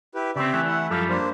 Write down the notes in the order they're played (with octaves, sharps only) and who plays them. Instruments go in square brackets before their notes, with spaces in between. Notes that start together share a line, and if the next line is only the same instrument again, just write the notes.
[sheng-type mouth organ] E4 G4 B4
[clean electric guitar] C#3 C4 [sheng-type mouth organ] G4 D5 E5
[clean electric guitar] E3 A3
[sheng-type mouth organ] E4 F#5
[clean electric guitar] F#2 F3 G3 [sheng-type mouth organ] A4 F5
[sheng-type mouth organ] A#3 D4 C5